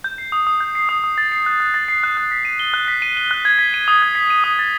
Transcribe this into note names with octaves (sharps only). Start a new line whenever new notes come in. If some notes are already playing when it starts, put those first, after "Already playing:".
G6
C7
D#6
D#6
G6
C7
D#6
D#6
A6
C7
F#6
F#6
A6
C7
F#6
F#6
B6
D#7
G7
F#6
B6
D#7
G7
F#6
G#6
B6
D#7
D#6
G#6
B6
D#7
D#6
A6